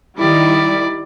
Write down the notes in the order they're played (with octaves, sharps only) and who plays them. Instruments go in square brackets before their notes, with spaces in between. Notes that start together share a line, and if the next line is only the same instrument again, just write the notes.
[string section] D#3 G3 [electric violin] E4 D5